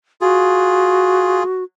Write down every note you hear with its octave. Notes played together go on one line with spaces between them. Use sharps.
F4 F#4 G#4